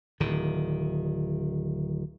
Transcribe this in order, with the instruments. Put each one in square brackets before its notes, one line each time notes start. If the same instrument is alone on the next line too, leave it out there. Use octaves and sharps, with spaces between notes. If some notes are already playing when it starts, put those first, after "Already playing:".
[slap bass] D1 D#3